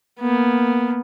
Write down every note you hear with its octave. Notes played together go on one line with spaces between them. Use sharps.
A#3 B3